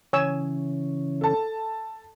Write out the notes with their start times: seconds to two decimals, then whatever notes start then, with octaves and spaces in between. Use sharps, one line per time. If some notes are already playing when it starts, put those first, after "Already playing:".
0.13 C#3 E3 C#4 C#5 G#5 E6
1.21 A4 A5